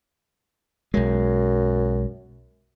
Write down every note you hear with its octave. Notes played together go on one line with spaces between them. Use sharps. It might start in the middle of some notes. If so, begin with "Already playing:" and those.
B1 F#2 G#3